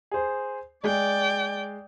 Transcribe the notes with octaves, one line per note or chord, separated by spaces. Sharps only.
G#4 C5
G#3 D5 G5